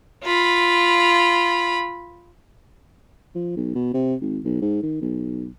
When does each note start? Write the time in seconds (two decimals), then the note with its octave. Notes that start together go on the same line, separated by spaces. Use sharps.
0.24 F4 B5
3.35 F3
3.56 B1
3.75 B2
3.94 C3
4.21 G#1
4.45 B1
4.62 G#2
4.83 D#3
5.01 B1